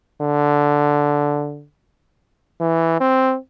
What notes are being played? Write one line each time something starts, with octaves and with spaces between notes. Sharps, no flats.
D3
E3
C4